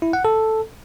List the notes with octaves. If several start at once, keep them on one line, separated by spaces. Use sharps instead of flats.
E4
F#5
A4